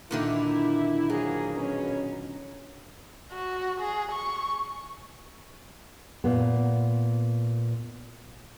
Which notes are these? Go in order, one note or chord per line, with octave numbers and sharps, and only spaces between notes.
A#2 D3 D#3 E4
F3 F#3 A#3 G#4
B2 C#4
F#4
G#4
C#6
A#2 B3